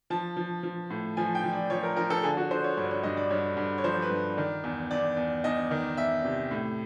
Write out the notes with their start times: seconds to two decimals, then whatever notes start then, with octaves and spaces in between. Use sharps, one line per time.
0.10 F3 A5
0.37 F3
0.63 F3
0.90 A2
1.17 F3 G#5
1.35 G5
1.44 F3
1.53 D5
1.70 F3 C#5
1.83 A#4
1.96 F3 A#4
2.10 A4
2.23 D3 G#4
2.37 F#4
2.51 D3 C5
2.64 C#5
2.77 G2 C#5
2.91 C#5
3.03 G2 D#5
3.17 D5
3.30 G2 C#5
3.57 G2
3.78 C#5
3.84 F3 C5
4.02 B4
4.10 G2
4.37 D#3 D5
4.64 E2
4.91 E2 D5
5.17 E2
5.44 E2 D#5
5.71 D#3
5.97 E2 E5
6.25 C3
6.51 A2